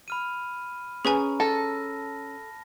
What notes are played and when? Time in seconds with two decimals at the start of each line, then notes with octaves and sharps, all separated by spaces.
0.08 B5 F6 D#7
1.05 C#4 G#4 B4 G#5 A#5
1.40 A4 A5 A#6